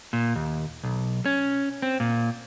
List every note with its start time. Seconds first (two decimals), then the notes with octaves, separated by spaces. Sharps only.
0.13 A#2
0.36 D#2
0.83 B1
1.26 C#4
1.82 C4
2.00 A#2